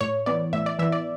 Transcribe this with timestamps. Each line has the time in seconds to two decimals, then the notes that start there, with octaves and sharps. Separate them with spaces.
0.01 A2 C#5
0.26 E3 B3 D5
0.53 A2 E5
0.66 D5
0.79 E3 B3 E5
0.92 D5